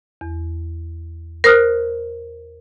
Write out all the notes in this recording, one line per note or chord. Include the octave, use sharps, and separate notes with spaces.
E2
A#4 C5 D#6 F6 F#6